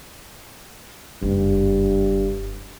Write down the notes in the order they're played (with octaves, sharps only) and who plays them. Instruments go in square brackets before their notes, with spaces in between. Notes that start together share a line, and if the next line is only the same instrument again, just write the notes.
[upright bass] F#1 [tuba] G2